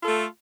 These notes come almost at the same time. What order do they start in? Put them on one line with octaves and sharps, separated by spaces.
F4 A4 A3